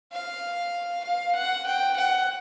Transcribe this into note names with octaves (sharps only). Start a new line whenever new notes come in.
F5
F5
F#5
G5
F#5